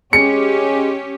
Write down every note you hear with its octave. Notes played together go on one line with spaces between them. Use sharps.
G#3 C#4 G4 C#7